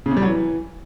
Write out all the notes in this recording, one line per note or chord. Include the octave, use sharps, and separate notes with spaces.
C#3
C3
G3
F#3
E3